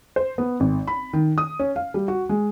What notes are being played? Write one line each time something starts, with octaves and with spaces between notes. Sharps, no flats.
C5
B3
G#1
B5
D#3
D#6
C#4
F5
G3
F#4
G#3